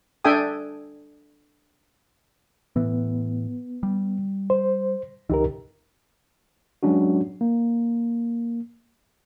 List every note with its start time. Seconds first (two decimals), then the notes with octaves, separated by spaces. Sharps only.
0.25 D4 A4 E5 G5 G#5 D#6
2.76 A2 E3 B3
3.83 G3
4.50 C5
5.30 C#2 E3 D#4 G4 A#4
6.83 F#3 G#3 C#4 D4 F#4
7.41 A#3